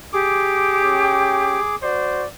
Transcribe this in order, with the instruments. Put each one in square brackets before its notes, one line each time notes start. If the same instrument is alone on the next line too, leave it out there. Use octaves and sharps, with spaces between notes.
[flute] G4 [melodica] G#4 D6
[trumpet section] C#4 G5
F#4 C5 D5